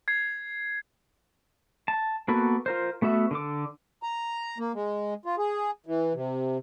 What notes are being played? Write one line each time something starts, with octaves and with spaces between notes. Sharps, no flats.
G#6 C7
A5
A#3 B3 F#4 A4 B4
F4 A#4 C5
A3 B3 F#4 E5
D3 A4 D6
A#5
A#3
G#3
F4
G#4
E3
C3